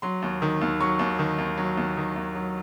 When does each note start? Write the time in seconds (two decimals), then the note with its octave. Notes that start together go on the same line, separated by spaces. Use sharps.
0.02 F#3 C6
0.22 D#2
0.42 D#3
0.61 D#2
0.81 F#3 C#6
0.99 D#2
1.19 D#3
1.38 D#2
1.58 F#3
1.77 D#2
1.97 D#3
2.16 D#2
2.35 F#3